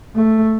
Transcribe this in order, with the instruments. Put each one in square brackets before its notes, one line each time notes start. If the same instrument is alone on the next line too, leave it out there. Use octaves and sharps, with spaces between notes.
[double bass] A3